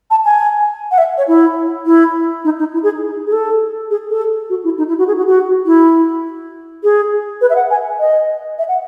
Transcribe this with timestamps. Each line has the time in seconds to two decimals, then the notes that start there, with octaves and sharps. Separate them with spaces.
0.11 A5
0.25 G#5
0.91 F#5
0.98 E5
1.18 C#5
1.28 E4
1.86 E4
2.45 D#4
2.59 D#4
2.74 E4
2.83 G#4
3.27 G#4
3.32 A4
3.90 G#4
4.10 A4
4.50 F#4
4.64 E4
4.78 D#4
4.88 E4
4.98 F#4
5.08 G#4
5.17 F#4
5.27 F#4
5.66 E4
6.84 G#4
7.41 B4
7.50 E5
7.56 F#5
7.71 G#5
8.00 D#5
8.59 E5
8.68 F#5